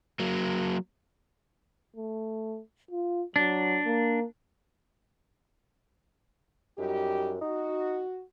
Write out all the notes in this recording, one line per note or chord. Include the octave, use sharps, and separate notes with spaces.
F#3 A#3
A3
F4
F#3 D4
A#3
F#2 G3 D#4 G4
D#4 F#4